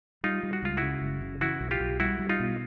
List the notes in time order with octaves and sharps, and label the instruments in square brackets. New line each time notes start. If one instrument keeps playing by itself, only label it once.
[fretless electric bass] G3 [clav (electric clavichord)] D#4 F4
[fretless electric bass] G3
[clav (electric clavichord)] F#4
[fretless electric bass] C#2 [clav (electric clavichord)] F4
[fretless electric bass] C#3 [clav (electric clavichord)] E4 F#4
[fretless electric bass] F#1
C#3
[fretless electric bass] E3 [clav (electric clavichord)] E4 F#4
[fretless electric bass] B1
[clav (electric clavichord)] F4 G4
[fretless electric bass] B1
[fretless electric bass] G3 [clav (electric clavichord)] E4 F#4
[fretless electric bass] G3
[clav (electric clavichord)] D#4 F4
[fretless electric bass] B2